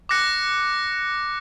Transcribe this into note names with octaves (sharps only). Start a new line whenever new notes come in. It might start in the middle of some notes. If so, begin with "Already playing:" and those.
D6 F#6 A#6 C#7